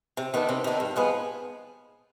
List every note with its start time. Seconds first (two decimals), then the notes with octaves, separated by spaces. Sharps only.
0.17 C3
0.34 D#3 B3 D4
0.49 C3
0.64 D#3 B3 D4
0.80 G2
0.96 F3 G#3 B3